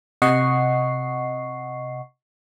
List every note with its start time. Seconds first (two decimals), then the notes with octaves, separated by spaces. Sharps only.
0.22 C3 D#5 F#5 C#6 C7